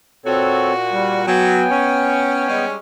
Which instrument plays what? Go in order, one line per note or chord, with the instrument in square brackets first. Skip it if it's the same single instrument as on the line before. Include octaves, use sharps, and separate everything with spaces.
[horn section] A#2 F#4 [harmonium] C4 A4 C#5
[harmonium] G3
[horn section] F#3 [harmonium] B3 G5 G#5
[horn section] C#4
G3 G#3 C#4